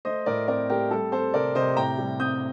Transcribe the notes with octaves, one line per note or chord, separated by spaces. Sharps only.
A3 C5 D#5
A2 A#4 D5
C4 A#4 D5
A3 G4 A#4
G3 A4
C4 A4 C5
C3 A#4 D5
C3 C5 D#5
A2 G5 A#5
G3
C4 D#6 G6